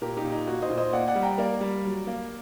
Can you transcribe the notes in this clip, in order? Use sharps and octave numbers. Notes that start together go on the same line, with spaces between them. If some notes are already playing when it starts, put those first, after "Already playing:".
A#2 G4 A#4
D#4 G4
A#2
D#4
A#3 F#4
C5 D#5
A#2
C5 D#5
A#3 D5 F#5
D5 F#5
G3
G5 A#5
A#3 A#4 D5
G3
F#3
A#3